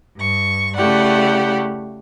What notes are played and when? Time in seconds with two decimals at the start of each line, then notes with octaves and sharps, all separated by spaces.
0.17 G2 C#6
0.76 C#3 A3 E4 G4 D5 F#5